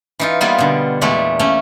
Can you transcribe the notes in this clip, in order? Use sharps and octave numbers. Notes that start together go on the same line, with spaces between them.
E3 D#4 F4
G3 A#3 B3 F4
B2 D3
E2 A#2 G#3 A3 G4
A3 A#3 C#4